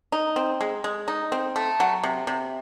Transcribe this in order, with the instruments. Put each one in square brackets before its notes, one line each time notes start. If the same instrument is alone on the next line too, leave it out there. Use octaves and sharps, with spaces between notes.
[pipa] D#4
C4
G#3
G#3
D#4
C4
A3
F#3
C3
C3